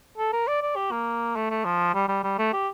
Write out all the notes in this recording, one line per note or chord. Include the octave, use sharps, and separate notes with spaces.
A4
A#4
D5
D5
G4
A#3
A3
A3
F3
G3
G3
G3
A3
G4